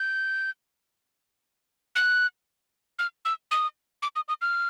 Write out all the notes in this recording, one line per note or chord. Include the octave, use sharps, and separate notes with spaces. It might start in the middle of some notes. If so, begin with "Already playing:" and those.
Already playing: G6
F#6
F6
E6
D#6
D6
D#6
D#6
F6